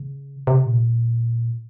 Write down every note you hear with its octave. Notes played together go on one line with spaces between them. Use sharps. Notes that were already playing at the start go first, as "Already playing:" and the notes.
Already playing: C#3
C3
A#2